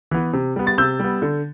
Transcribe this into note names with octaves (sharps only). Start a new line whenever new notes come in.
E3 B3
C3
G3 B3
A6
C3 E6 G6
G3 B3
D3